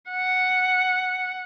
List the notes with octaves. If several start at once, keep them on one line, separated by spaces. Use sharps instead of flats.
F#5